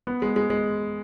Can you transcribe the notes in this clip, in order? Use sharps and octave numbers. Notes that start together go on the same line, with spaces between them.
B3
G#3
G#3
G#3